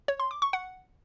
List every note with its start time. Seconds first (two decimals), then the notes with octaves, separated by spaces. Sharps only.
0.08 C#5
0.20 C6
0.31 D6
0.42 C#6
0.53 F#5